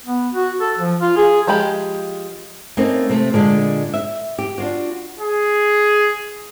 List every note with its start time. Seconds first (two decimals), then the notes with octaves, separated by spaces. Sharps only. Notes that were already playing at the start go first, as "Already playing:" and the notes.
0.06 B3
0.33 F#4
0.60 A4
0.78 F3
1.01 F4
1.17 G#4
1.47 F3 G#3 G4 B5
2.77 A3 A#3 C4 C#4 D#4
3.09 C3 A3 C4
3.33 A#2 D3 G#3 D4
3.94 E5
4.38 G4
4.58 D4 F4 F#4
5.20 G#4